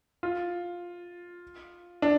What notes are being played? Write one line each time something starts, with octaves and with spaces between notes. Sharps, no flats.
F4
D4